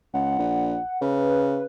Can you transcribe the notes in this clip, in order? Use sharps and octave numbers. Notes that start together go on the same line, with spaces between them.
C#2 F#5
A#1
C#3 B4